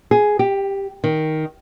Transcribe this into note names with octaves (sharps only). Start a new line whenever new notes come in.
G#4
G4
D#3